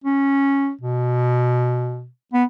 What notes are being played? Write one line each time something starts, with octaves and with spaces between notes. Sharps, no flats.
C#4
B2
B3